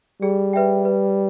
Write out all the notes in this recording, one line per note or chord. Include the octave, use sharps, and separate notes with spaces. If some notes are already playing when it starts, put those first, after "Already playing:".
G3 G#4
B4 E5 G5
B4